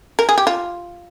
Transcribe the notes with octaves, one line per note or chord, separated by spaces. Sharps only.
A#4
G#4
G4
F4